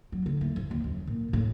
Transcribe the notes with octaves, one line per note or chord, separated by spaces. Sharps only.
F#3
D3
A3
F3
D#2
F#2
A#2
A2